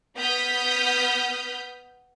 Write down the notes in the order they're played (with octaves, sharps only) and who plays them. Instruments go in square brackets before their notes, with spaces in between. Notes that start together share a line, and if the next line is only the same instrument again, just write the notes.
[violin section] B3 D#6 F6 G6 B6